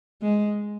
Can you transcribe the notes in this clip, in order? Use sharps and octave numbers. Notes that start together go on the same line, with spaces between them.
G#3